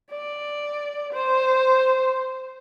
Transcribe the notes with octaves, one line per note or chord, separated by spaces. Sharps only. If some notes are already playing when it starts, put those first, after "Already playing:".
D5
C5